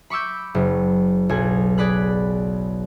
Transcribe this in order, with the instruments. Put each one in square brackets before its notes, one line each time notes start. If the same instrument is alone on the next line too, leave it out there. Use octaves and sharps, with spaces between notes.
[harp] B5 C#6 D6 E6 G6
F#1
B1 B3 G#5
G#4 D5 B5 F#6